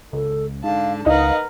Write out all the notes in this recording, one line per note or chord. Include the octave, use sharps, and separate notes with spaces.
C#2 A4
G#2 D3 F5 A5
C#2 D#4 A#4 B4 F5 F#5